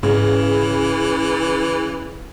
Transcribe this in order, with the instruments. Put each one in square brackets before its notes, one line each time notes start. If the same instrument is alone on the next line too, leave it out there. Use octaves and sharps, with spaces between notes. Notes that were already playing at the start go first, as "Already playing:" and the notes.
[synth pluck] G#2 [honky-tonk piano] C#3 [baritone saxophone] E3